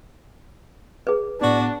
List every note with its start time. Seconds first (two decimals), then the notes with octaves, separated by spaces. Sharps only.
1.07 G#4 B4
1.41 A2 B3 D4 F#4 D5